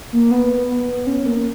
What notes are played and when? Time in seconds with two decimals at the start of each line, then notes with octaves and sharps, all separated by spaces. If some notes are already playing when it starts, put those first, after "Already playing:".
0.13 A#3
0.31 B3
1.07 C#4
1.26 A#3